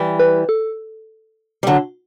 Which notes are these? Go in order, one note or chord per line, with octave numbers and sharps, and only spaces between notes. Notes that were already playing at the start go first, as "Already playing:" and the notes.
Already playing: E3 G3
B4
A4
G3
D3 F#3